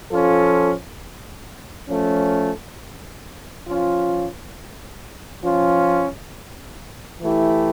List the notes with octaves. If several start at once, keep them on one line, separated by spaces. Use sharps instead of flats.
F3 C#4 F4 A4
F3 A3 C#4
F3 C#4 F4
F3 C#4 F4
E3 A3 E4 G4